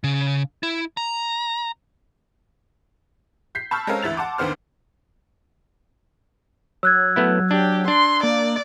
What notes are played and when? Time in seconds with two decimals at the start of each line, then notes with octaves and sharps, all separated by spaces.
0.04 C#3
0.63 E4
0.97 A#5
3.55 G6 B6 C7
3.71 A5 B5 C#6 E6 F6 G6
3.87 G#3 C4 C#4 A4 A#4 F5
4.02 D2 E3 E5 A6 F7
4.17 F#5 A5 C6 D6
4.38 D#2 D3 D#3 B3 C5 F6
6.83 F#3 E6 F#6 G#6
7.16 A3 B3 E4
7.51 D4 G4
7.88 D4 C6
8.23 A#3 D5